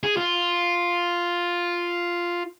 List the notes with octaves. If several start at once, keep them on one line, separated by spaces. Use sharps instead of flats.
G#4
F4